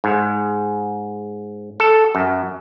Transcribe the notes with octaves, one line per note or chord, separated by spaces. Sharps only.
G#2
A4
F#2